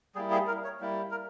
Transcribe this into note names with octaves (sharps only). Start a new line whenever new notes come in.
G3 A#3 E4 G#4
G#4
A#4
C#5
G3 A#3 E4
A#4